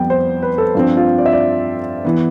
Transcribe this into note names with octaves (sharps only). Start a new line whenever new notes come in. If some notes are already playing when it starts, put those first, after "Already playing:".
Already playing: F2 G3 B3 G5
C5
B4
A4
G2 F3 C4
F4
D5
E5
D5
E3 B3